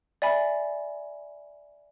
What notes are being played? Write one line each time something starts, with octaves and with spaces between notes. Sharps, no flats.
D5 E5 G#5 B5